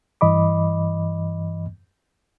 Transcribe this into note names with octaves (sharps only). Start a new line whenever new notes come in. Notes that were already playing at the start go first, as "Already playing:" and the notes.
G2 E3 D#5 B5 D6